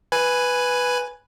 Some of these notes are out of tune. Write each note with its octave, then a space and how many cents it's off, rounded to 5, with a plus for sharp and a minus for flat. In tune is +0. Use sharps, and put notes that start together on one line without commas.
B4 +0 G#5 +0